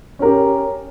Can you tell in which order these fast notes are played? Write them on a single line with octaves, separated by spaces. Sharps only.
C#4 A#4 G4